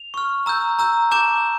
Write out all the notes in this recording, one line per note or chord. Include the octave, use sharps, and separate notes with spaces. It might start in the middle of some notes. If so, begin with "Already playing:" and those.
Already playing: F7
C#6 F6
A#5 E6 G6
A#5 E6 G6
A5 D6 G6 E7